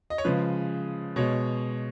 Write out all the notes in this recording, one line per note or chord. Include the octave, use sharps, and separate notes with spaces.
D#5
C#5
C#3 F3 G#3 B4
B2 G#3 C#5